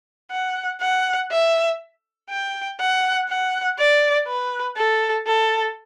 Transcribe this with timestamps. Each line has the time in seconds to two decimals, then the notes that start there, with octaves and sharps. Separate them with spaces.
0.31 F#5
0.81 F#5
1.31 E5
2.30 G5
2.80 F#5
3.29 F#5
3.78 D5
4.27 B4
4.77 A4
5.26 A4